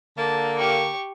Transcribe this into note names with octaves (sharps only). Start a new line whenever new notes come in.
D3 A#3 A5
G4 C#6